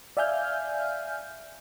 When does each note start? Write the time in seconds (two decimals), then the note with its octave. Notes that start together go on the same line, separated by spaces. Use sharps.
0.17 D5 E5 F5 G#5 F6 G6